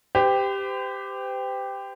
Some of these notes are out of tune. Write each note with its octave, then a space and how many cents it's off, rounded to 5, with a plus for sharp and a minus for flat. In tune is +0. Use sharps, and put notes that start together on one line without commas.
G4 +5 C5 -45